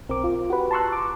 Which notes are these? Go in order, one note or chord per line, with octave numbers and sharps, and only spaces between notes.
B1 C4 A#4 D6
F4
F#4 G4 B4
A5 A#5 C6 C#6 E6 F#6
D6